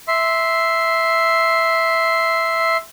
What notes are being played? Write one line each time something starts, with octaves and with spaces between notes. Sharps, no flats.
E5 C6